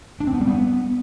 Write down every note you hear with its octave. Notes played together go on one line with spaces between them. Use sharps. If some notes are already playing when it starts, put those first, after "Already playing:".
D4
C4
B3
G3
B3